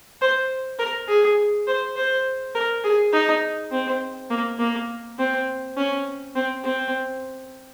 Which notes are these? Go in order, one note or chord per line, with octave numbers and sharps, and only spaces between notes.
C5
A#4
G#4
C5
C5
A#4
G#4
D#4
C4
A#3
A#3
C4
C#4
C4
C4